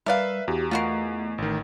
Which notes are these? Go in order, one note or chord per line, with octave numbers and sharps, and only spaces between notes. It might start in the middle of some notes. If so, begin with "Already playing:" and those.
G3 A#4 B4 D5 E5 F5
E2 F#4 G4
A3 F4 F#4 A#4 D#5 C7
A1 D#3